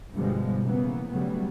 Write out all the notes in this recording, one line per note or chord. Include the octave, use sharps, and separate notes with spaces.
G2 B2 D3 F3 G3 G#3
C#3 E3 A#3 B3
C#3 F#3 G3 A3 B3